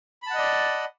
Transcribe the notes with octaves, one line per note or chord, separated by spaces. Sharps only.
D5 D#5 F#5 A5 B5